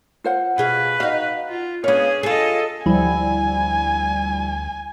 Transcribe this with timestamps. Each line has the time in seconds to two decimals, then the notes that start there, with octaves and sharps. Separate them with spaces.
0.24 F4 C5 F#5
0.58 B2 G#4 B4 F5
1.00 D#4 F#4 F5
1.49 F4
1.84 B3 C#4 D4 G#4 C#5 F5
2.23 F4 G#4 A4 D#5
2.86 D2 F3 G3 E4 G#5